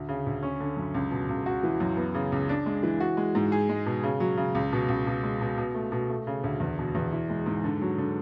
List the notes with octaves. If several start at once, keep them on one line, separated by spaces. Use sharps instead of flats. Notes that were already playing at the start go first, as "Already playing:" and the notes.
Already playing: D2
C#3
D2
C#4
D3
F#2
C#2
B2
C#2
F#4
E3
F#2
B3
C#3
C#2
D4
G#3
E3
F#4
G#3
G#2
G#4
G#3
B2
C#3
F#3
C#3
C#2
B2
C#2
B2
G#3
B2
B2
A3
B2
A3
C#3
D2
E2
B2
E2
E4
G#3
G#2
D3
F#3
D3